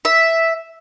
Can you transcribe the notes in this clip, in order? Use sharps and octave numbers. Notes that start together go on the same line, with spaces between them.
E5